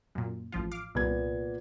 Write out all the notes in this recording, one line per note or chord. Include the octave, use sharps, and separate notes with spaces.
F#2 A#2
A1 F3 F4
F5 D6
C2 A#2 B3 G#6